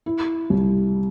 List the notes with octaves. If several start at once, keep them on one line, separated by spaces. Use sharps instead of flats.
E4
C2